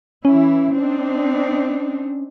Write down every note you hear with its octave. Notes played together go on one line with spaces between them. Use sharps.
E3 C#4 E4
C4 D4 D#4